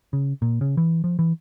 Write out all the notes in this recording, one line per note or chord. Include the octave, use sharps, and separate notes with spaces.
C#3
A#2
C#3
E3
F3
E3